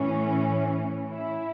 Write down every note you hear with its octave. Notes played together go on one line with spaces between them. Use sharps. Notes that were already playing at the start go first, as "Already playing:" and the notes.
Already playing: A2 E3 C#4
E4